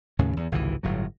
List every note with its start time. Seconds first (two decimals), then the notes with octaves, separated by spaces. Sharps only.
0.19 D#2 A2 C#3 C#4
0.37 E2
0.52 G#1 C#2 C3 E3
0.83 G1 A2 F#3